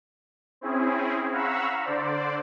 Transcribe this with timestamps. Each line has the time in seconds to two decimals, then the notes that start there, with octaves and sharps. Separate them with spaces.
0.61 C4 C#4 E4 G#4
1.32 F5 F#5 A#5 B5 C#6 E6
1.84 D3 C5 D5